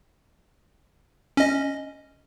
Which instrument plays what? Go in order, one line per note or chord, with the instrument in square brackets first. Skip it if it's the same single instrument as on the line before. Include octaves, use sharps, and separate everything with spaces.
[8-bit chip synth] C#4 D#5